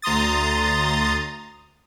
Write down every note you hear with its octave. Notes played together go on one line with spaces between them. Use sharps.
D2 A#5 C6 D#6 A6